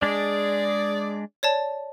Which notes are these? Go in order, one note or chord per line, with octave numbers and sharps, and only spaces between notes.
G#3 D4 G#4 D5
C#5 D5 A5